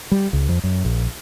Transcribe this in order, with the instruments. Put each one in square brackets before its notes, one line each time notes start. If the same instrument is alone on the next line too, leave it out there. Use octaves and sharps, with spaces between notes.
[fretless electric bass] G3
C#2
F2
F#2
A#1